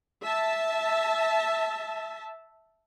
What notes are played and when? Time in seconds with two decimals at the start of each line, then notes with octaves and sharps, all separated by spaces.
0.22 E5 A5